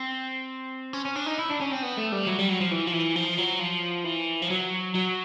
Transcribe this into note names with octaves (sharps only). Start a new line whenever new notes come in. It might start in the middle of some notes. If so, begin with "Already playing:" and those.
Already playing: C4
C#4
C#4
D4
D#4
E4
D4
C#4
C4
B3
A3
G3
F#3
G3
F#3
F3
E3
F3
E3
F3
F#3
F3
E3
F3
F#3
F#3